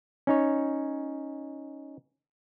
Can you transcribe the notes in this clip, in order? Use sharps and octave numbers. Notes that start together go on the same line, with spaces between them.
C#4 D#4 C#5